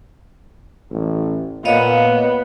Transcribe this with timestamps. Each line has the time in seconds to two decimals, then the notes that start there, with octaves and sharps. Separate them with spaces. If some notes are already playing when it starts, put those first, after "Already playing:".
0.91 A1
1.65 A#2 B3 C#5 D#5 F5